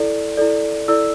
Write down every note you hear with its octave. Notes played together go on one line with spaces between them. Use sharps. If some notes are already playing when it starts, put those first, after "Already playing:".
Already playing: E4 A4 D5
E4 A4 D5
E4 A4 D5 E6